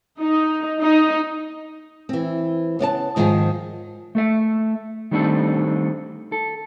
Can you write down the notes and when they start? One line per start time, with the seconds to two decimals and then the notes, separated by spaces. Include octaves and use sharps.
0.20 D#4
0.81 D#4
2.09 E3 C4
2.79 C#3 B3 D5 A5
3.16 G#2 D#3 F3 F4 G#4
4.15 A3 A4 E5
5.11 D#3 G3 A3 C4 D4 A4
6.32 A4